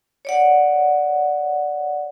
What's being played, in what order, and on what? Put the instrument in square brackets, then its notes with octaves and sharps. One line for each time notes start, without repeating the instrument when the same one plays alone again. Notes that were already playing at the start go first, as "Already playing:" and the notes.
[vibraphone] C#5 D5 F#5